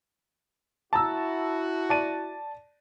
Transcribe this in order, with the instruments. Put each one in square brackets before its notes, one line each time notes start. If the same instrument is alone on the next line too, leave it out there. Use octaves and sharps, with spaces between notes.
[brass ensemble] E4 F#4 [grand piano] A5 A#5 E6
[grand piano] D5 A5 D#7